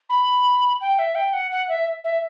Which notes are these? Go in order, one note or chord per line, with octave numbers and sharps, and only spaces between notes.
B5
G5
E5
G5
F#5
F#5
E5
E5